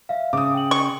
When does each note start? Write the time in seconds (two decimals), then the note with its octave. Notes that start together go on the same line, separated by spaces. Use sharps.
0.09 E5 F5
0.33 C#3 D6 D#6
0.54 G5 F#7
0.71 C#6